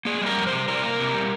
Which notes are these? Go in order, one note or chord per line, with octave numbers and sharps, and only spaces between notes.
A#3 G#4
G3 A#4
F2
C5
C3
C3 A#4
A#3
C3
G3